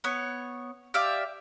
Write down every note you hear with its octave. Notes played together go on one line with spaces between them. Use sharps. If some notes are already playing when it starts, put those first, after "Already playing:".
B3 C#5
G4 D5 E5 F5